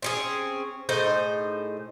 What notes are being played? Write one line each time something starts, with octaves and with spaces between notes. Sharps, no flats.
C4 C#4 G#4
A2 D#4 G#4 C5